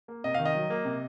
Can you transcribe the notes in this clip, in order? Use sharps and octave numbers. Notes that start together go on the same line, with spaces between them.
A#3
C3 D#5
D#3 F5
D#5
F#3
A#3
C3